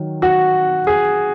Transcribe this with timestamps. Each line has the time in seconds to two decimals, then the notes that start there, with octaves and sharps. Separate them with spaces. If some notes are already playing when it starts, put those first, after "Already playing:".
Already playing: D#3 F#3
0.22 F#4
0.87 G#4